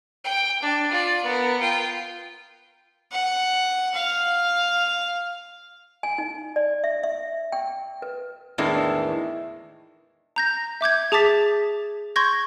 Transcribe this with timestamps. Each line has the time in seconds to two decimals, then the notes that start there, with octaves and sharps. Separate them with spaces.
0.24 G5
0.62 D4
0.91 F4 D5
1.23 B3 A#4
1.60 F4 G5
3.12 F#5
3.95 F5
6.03 G#5
6.18 D#4
6.56 D5
6.84 E5
7.03 E5
7.52 G5
8.02 B4
8.58 E2 A2 D#3 E3 G#3 D4
10.36 A#5 G6 A#6
10.81 E5 D6 G6 G#6
11.12 G#4 A5 D6 A6 B6
12.16 C6 C#6 G6 G#6 A#6